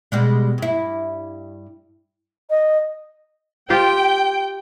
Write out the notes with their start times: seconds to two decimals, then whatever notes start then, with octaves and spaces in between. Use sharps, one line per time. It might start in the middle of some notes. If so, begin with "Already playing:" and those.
0.12 B2 G3 G#3
0.58 G2 E4
2.50 D#5
3.70 F4 G4 C5 G5